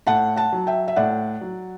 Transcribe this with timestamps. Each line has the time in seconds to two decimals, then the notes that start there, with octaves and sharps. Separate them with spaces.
0.07 A2 F#5 A5
0.36 F#5 A5
0.52 F#3
0.67 E5 G5
0.88 E5
0.96 A2 D5 F#5
1.41 F#3